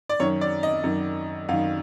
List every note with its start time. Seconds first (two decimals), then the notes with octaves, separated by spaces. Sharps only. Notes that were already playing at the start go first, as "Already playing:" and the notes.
0.09 D5
0.20 F#2 D#3 C#5
0.41 D5
0.63 D#5
0.84 F#2 D#3
1.49 F#2 D#3 F5